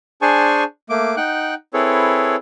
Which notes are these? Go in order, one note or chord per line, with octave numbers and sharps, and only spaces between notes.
D4 G#4 C5 G#5 A5 C#6
A3 A#3 D6
D#4 F#5 G5 F#6
C4 E4 G#4 A4 B4 C#5